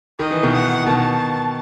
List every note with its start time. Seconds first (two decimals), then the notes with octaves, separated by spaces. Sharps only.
0.19 D#3 D#5
0.31 E3
0.43 B2 D#3
0.53 F#5
0.86 B2 D#3 A5